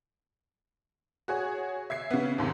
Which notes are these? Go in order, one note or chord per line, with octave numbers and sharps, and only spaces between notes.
F#4 G#4 C#5
E5 G#6 C7
C#3 B3
D#2 G#2 C3